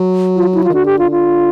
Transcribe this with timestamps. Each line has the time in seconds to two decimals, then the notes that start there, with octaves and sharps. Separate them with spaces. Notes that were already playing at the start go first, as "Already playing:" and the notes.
Already playing: F#3
0.36 F4
0.55 E4
0.64 F4
0.70 D#3
0.74 D3 F#4
0.86 G4
0.99 F4
1.11 F4